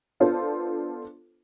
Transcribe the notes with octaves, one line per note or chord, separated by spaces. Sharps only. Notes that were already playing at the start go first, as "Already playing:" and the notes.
B3 D4 F4 A4 C5